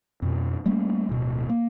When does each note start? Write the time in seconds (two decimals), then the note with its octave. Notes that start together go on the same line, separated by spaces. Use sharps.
0.22 F2 B2
0.66 G3 A3 A#3 C#4
1.09 D1 B2
1.49 A#3